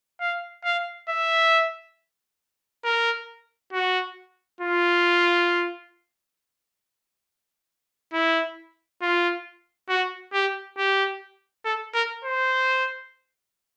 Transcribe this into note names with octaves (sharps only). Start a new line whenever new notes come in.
F5
F5
E5
A#4
F#4
F4
E4
F4
F#4
G4
G4
A4
A#4
C5